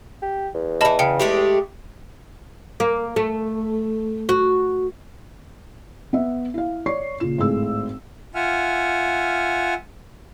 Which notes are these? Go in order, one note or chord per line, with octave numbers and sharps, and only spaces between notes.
G4
E2
E3 G3 D#5 A5 B5
C#3 G5 C#7
G#3 A3 G4
A#3
A3
F#4
B3 E5
E4 F5
C#5 D5 C#6 C7
A#2 C#3 F4 E7
G#1 A2 G#4 E6
F4 E5 F#5 G#5 F6